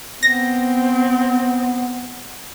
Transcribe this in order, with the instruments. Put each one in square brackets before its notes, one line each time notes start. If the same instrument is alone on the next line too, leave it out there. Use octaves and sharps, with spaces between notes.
[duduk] B3 [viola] C4 [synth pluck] A#6